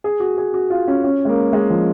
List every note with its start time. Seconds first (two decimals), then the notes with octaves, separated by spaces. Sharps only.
0.04 G#4
0.20 F#4
0.38 G#4
0.54 F#4
0.70 F4
0.88 C#4
1.04 C#4
1.25 G#3
1.29 A#3
1.53 G#3
1.70 F3